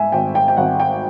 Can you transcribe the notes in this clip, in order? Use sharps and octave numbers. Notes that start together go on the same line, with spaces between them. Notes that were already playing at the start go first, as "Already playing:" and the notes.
Already playing: G#2 E5 G#5
G#1 G5
G5
G5
G#1 F#5
G5